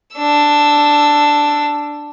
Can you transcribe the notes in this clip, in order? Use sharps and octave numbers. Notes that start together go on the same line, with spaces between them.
D4 E6